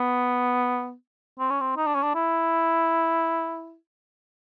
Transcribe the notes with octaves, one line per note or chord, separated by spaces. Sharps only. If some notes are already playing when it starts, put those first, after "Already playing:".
Already playing: B3
C4
C#4
C4
D#4
D4
C#4
D4
E4